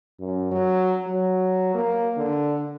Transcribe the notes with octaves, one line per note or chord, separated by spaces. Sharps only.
F#2
F#3
F#3
A#3
D3